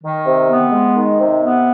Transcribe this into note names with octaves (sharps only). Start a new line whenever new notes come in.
D#3
C3
B3
G#3
D#3
C3
B3